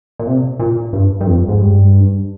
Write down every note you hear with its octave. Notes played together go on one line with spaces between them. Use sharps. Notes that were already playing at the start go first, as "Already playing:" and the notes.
A#2
C3
A#2
G2
G2
F2
G#2
G2